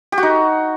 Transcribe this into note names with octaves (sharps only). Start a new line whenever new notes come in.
G4
F#4
D#4